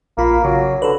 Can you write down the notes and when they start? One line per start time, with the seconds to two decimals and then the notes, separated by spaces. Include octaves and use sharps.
0.18 A#1 A#3 F4 B5
0.44 C#3 F#3
0.82 D3 A4 B4